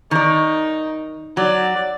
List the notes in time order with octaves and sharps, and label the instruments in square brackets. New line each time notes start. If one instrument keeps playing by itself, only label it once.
[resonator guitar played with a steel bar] D#3 D5 [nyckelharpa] D#4
[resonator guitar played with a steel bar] F#3 [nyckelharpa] D5